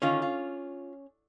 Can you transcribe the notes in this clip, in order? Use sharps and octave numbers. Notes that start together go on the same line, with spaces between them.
D3 D#3 C#4 F4
F4